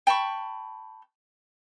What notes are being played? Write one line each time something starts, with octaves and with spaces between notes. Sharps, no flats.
G5 A5 B5 C#6